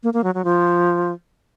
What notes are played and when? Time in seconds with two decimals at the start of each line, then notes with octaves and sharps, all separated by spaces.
0.03 A#3
0.14 A#3
0.24 F#3
0.35 F#3
0.45 F3